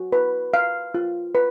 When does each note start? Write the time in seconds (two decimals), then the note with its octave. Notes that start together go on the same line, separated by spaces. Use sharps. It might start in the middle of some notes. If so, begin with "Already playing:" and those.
Already playing: F#4
0.12 B4
0.54 F5
0.94 F4
1.35 B4